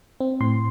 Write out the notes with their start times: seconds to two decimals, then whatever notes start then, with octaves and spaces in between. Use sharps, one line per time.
0.20 C4
0.41 A2 C6